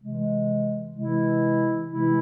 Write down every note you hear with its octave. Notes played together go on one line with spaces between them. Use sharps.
C3 E3 G#3
C3 E3 G#3 E4
C3 E3 G#3 E4